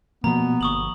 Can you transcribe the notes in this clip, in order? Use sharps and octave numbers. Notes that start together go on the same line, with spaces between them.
B2 F3 A#3 B3 A#5
G1 C#6 D#6 F#7